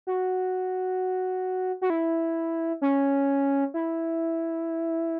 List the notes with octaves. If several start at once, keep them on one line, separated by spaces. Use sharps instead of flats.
F#4
F#4
E4
C#4
E4